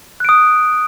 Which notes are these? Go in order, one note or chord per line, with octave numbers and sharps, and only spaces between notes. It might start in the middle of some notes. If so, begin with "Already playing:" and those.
D#6 F#6 D7